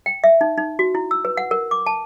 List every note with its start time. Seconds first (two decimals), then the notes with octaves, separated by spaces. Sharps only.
0.06 G5
0.24 E5
0.41 D#4
0.57 D#4
0.79 F#4
0.95 E4
1.11 E6
1.25 B4
1.37 F#5
1.51 A#4
1.71 D6
1.86 A5